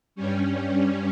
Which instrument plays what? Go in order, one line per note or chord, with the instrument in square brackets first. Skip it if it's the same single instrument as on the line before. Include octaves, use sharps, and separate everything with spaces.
[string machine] G2 G3 C#4